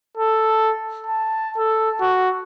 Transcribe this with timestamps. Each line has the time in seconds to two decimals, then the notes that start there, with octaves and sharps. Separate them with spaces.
0.17 A4
1.07 A5
1.57 A4
2.01 F#4